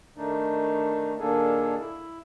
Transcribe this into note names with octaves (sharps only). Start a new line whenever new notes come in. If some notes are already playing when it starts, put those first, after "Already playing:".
D#3 A3 D4 D#4
A#2 D#3 A#3 D4 G#4 A4
E4